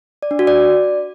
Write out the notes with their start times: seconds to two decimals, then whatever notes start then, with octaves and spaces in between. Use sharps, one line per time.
0.23 D5
0.31 D4
0.39 F#4
0.47 D5